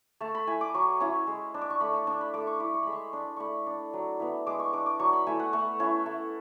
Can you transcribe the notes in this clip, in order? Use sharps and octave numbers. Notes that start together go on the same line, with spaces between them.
A3 A5
B5
E4 G#5
D6
F#3 C#6
C#4 E4
G#3
D4
D6
C#6
A3 B5
A5
D4 A5
B5
A3 D6
C#6
E4 D6
C#6
G#3 B5
C#6
D4
A3 B5 C#6
D4
F#3
B3 E4
G#3 D6
C#6
D4 D6
D6
F#3 C#6
B5
A3 E4 G#5
F#5
A3 C#6
C#4 E4
A3